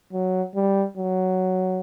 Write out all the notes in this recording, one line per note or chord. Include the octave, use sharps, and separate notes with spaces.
F#3
G3
F#3